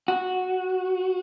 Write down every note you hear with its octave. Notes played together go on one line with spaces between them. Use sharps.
F#4